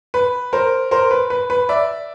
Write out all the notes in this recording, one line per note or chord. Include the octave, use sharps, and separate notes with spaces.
B4
A#4 C5
A#4 C5
B4
B4
B4
D5 E5